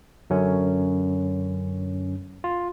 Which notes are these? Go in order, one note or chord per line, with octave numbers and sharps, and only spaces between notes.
F#2 D3 C#4
F4